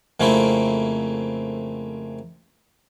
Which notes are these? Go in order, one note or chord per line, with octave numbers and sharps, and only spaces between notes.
F2 C#3 A3 A#3 C4 E4